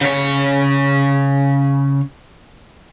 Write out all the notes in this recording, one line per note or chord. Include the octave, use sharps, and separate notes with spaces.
C#3 C#5